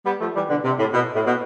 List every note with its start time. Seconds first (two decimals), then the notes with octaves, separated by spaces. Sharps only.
0.06 G3 B3
0.20 F3 A3
0.35 E3 G3
0.49 B2 D3
0.64 C3
0.79 A2
0.94 B2
1.16 A2
1.26 B2